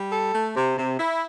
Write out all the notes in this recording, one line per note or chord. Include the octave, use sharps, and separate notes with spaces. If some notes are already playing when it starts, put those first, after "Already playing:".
Already playing: G3
A4
A3
C3
C3
E4